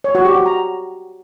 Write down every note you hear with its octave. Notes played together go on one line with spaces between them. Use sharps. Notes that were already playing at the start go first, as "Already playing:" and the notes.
C#5
F#4
G4
F#4
A#5